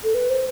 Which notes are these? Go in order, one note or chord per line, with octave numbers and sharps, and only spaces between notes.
A4
B4
C5